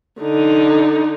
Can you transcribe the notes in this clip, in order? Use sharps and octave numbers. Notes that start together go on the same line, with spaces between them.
D3 D#4